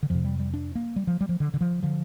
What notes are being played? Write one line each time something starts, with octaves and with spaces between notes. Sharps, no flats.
D3
F2 C3 F3
G3
G3
D4
A#3
G3
F3
G3
F3
D3
D3
F3
D3 F3